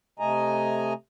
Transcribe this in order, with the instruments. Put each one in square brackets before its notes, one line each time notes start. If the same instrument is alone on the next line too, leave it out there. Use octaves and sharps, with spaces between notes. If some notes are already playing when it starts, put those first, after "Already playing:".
[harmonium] C3 A3 D#5 G#5 A#5